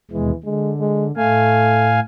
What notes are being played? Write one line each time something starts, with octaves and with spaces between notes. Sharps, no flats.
D#2 B2 E3 G#3
D3 G#3
G#3
A2 A3 F5 G#5